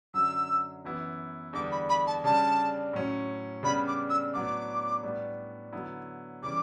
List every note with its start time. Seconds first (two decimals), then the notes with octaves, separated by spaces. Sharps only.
0.14 F#2 D3 F#3 E6
0.84 F#2 E3 B3 E4
1.53 E2 D3 G3 D4 D6
1.71 B5
1.89 B5
2.07 A5
2.24 C#3 G3 D4 A5
2.93 A2 F#3 C#4
3.63 C#3 G3 B3 D4 B5
3.87 D6
4.09 E6
4.33 A2 F#3 B3 D4 D6
5.03 A2 G3 B3 D4
5.73 D3 F#3 B3 E4
6.43 C#3 E3 G3 D6